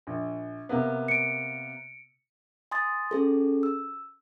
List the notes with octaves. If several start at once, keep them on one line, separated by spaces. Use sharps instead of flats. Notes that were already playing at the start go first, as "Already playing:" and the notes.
A#1
C3 A#3 B3
C#7 D7
G#5 C6 D#6 A6
C#4 G#4 A4
E6